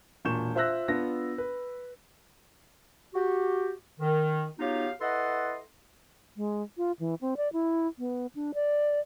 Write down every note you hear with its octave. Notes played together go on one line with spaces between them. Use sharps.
E1 A#2 C#6 G6 E7
F4 C5 E5 E6 F#6 A#6
B3 D4 F4 A#6
B4
F#4 G4
D#3
F#3 B3 D#4 F4 G4 F5
E4 A4 B4 D#5 F#5 C6
G#3
F4
E3
C4
D5
E4
B3
D4
D5